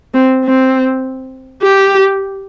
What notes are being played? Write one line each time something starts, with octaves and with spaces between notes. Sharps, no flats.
C4
C4
G4